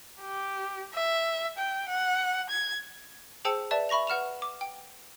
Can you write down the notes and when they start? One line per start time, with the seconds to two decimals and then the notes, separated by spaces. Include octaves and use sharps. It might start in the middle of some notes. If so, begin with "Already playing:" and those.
0.21 G4
0.94 E5
1.58 G5
1.89 F#5
2.50 G#6
3.45 G#4 C5 G5 A5 E6 C#7
3.71 B4 D5 E5 A5
3.89 E5 B5 C#6 A#6 F7
4.07 B4 F#5 F6 E7 F7
4.42 D6
4.61 G5